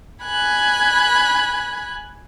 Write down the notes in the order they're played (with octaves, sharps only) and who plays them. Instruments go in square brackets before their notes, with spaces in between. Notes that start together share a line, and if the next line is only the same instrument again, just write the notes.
[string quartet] G#5 B5 F#6